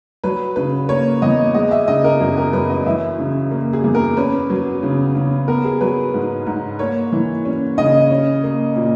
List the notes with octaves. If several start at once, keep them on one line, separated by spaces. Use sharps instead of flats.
F#3 B4
C#3 B4
A#3 C#5
E2 D#5
G#3 D#5
E5
C#3 D#5
A#4
F#2 G#4
A#4
F#2 B4
D#5
E3 E5
C#3
A#3
G#4
E2
A#4
C#4 B4
F#3
C#3
C#3
B3 A#4
G#4
F#3 B4
G#2
G#2
A#3 C#5
E3
C#4
C#3 D#5
C#4
A#3
A#2